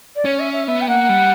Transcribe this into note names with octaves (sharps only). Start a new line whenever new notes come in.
D5
C#4 C#5
E5
E5
B3 E5
G5
A#3 F#5
G3